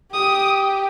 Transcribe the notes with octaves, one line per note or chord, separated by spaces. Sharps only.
G4 D#6